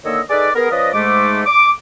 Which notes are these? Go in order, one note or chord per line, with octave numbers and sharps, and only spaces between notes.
D3 D#3 A#3 C#5 D#5 E6
D#4 G#4 A4 B4 D5
B3 G#4 A#4
F3 C#4 B4 D5 D#5
G#2 G#3 A3 D6
D6